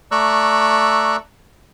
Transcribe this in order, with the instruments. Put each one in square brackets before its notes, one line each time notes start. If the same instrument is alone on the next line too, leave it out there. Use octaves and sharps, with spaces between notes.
[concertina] A3 D5 A#5 C#6 E6 F#6